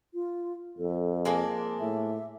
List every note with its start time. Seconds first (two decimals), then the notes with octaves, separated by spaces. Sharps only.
0.14 F4
0.78 F2 A4
1.25 G#3 A#3 D4
1.80 A2 E5